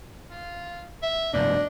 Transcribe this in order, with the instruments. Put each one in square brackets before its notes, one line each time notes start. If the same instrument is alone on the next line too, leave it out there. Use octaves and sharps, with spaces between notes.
[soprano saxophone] F4
E5
[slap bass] F1 G2 B2 [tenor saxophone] D4 [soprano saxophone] D#5